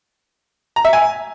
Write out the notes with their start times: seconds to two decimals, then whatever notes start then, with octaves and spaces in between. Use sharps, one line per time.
0.76 A#5
0.85 E5
0.93 G#5